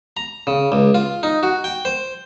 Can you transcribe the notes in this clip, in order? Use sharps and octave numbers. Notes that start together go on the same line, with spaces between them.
A#5
C#3
C#2
F4
D#4
F#4
G5
C5